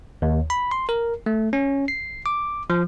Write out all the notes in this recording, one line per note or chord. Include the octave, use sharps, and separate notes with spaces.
D#2
B5
C6
A#4
A3
C#4
C7
D6
F3